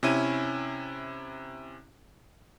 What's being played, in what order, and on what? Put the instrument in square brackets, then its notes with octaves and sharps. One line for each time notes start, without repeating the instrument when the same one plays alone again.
[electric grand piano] C3 C#4 E4 D#7